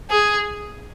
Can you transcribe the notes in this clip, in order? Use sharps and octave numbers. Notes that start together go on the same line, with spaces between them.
G#4